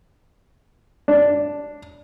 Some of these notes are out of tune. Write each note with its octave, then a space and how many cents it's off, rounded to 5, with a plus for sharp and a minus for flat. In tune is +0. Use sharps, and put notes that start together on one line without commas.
D4 -5